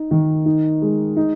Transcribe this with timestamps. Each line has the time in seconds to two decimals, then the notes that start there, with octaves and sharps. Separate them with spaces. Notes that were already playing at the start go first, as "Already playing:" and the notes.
Already playing: D#4
0.11 D#3
0.46 D#4
0.82 G#3
1.16 D#4